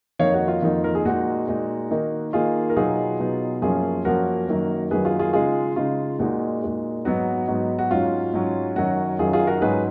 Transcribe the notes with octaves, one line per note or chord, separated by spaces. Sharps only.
F2 D#3 A#3 D#4 C#5 F5
F#4
F4
F2 D#3 A#3 D#4
A#4
G#4
A#2 G#3 D#4 F#4
A#2 G#3 D#4
D#3 A#3 D#4
D#3 A#3 D#4 F4 G#4
A#4
B2 F#3 B3 D#4 F4 G#4
B2 F#3 B3 D#4
F#2 F3 A#3 C#4 F4 G#4
F#2 F3 A#3 C#4 F#4 A#4
F#2 D#3 F#3 A#3
F#2 D#3 F#3 A#3 G#4 B4
F4 G#4
F4 G#4
C#3 G#3 D#4 F4 G#4
C#3 G#3 D#4 F4
A#2 G#3 D#4 F#4
A#2 G#3 D#4
G#2 F#3 B3 D#4 F#4
G#2 F#3 B3 D#4
F#4
G#2 F#3 C#4 F4
G#2 F#3 C#4
F#2 D#3 F#3 C#4 F#4
F#2 D#3 F#3 C#4 F4 G#4
F4 G#4
F#4 A#4
G#2 F#3 C#4 G#4 B4